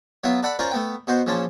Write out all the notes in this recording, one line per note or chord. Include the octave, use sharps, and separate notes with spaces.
F#3 B3 F4 E5
A4 D5 F#5 B5
C#4 F4 A#4 C5 D5
A3 B3 G5
B2 F#4 C5
A#1 F3 C#4 A5 C6